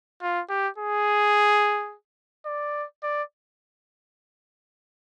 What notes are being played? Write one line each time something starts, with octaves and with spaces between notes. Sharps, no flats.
F4
G4
G#4
D5
D5